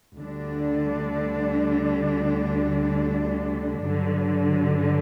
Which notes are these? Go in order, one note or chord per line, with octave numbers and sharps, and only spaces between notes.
D2 D3 G3 D4
G2 D3 F#3